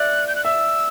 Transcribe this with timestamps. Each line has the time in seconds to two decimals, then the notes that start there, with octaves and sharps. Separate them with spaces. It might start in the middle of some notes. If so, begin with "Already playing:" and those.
Already playing: D5 E5 F#6
0.28 G6
0.36 F#6
0.45 E5 E6